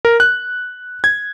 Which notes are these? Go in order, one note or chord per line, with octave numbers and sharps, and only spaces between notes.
A#4
F#6
G#6